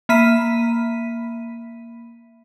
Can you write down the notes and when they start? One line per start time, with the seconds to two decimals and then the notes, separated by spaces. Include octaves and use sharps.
0.09 A#3 E5 B5 B6 D#7